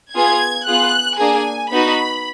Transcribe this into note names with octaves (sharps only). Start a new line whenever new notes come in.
B3 F4 G#4 G#6
B3 F4 G#4 F#6
A#3 D4 G#4 G#5
B3 D#4 F#4 B5